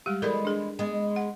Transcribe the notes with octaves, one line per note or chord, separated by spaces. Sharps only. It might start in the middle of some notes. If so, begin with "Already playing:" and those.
G3 G#3 G4
E3 G#3 B3 A4 A#4 D5
D4 G#4
G#3 B3
F#5